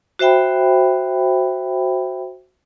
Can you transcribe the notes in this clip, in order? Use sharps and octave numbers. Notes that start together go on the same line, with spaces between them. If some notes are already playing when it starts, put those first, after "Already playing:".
F#4 C5 E5 G5 B5